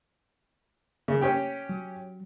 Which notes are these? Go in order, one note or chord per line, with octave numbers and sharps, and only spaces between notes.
C#3
C#4 G4 G5
F#3